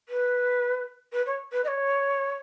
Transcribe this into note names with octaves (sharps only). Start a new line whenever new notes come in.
B4
B4
C#5
B4
D#5
C#5